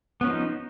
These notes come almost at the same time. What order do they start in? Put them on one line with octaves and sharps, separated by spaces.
B3 C#4 F3 D#4